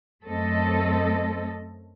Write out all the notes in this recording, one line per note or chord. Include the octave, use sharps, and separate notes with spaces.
F#2 A3 C4 A4 D#5